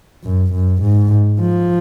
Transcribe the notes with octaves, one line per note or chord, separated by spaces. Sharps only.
F#2
F#2
G#2
F3